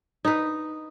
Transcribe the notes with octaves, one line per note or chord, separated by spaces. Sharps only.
D#4 B4